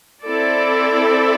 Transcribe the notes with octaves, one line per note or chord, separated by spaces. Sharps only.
C4 E4 A4 D5